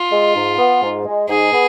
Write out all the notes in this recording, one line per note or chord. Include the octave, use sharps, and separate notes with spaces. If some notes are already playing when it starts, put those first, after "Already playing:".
Already playing: F4
G#3
G#2
B3
G#2
G#3
G#2 G#4
B3